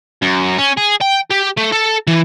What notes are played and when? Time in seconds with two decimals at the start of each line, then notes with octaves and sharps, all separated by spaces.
0.22 F#2
0.58 C#4
0.77 G#4
1.01 G5
1.30 G4
1.57 A3
1.72 A4
2.07 E3